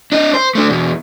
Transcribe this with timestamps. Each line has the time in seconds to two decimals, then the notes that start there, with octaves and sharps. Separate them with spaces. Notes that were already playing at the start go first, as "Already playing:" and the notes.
0.12 D4 D#5
0.33 C5
0.55 A3 D4
0.70 E2 B2